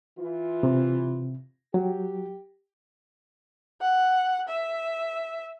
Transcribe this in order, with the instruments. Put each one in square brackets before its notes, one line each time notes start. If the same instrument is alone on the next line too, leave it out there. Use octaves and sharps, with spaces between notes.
[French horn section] E3 F4
[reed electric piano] C3
[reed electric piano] F#3 [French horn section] G4
[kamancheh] F#5
E5